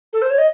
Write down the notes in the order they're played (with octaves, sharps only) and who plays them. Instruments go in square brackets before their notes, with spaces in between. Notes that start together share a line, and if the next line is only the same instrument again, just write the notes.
[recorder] A4
C5
C#5
D#5